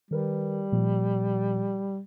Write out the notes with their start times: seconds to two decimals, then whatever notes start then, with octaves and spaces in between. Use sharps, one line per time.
0.11 D#3 G3 A#4 B4
0.72 A#2 F3